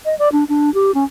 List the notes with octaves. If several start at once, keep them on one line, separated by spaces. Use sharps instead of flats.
D#5
D5
D4
D4
G4
C#4